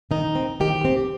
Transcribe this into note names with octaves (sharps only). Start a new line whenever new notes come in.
D#3 D#4
C4
D#3 G4
C4